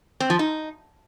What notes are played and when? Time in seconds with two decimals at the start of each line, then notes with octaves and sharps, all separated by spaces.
0.20 C4
0.30 F3
0.39 D#4